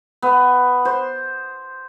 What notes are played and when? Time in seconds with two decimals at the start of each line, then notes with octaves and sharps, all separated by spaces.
0.22 B3
0.85 C5